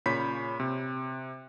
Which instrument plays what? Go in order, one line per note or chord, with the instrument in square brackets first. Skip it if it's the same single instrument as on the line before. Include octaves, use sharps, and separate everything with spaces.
[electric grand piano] A#2 C#3 C#5 B5 G6 B6
C3